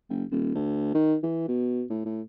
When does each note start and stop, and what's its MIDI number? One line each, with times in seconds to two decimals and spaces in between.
0.10 0.24 30
0.31 0.50 27
0.55 0.91 38
0.94 1.16 51
1.23 1.48 52
1.48 1.83 47
1.90 2.05 45
2.06 2.22 45